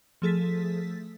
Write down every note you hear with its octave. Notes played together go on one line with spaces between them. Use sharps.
F3 A3 G#4 A4 A6 B6